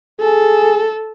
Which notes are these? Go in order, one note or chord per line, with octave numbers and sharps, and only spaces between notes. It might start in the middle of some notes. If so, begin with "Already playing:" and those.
G#4 A4